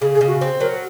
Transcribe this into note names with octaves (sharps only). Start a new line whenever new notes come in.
C#3 G#4
G#4
C#3
F#4
C4
F#3 A#4